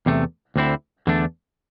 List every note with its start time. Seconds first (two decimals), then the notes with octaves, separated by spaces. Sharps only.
0.06 E2 C3 A3
0.56 D2 D3 C4 E4
1.07 E2 D3 A3 D4